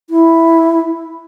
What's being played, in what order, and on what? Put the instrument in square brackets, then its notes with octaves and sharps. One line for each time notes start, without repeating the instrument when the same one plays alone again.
[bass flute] E4